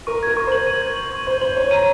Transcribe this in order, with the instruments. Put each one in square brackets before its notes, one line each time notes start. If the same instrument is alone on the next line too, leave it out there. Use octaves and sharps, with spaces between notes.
[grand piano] A#4 [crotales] C#6
[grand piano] A#4 [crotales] G#6
[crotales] C#6
[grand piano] C5 [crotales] F#7
[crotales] D#7
G#6
F#7
C#6
[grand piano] C5 [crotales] G#6
[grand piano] C5 [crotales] F#7
[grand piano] C#5 [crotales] F#7
[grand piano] A#5 [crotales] D#7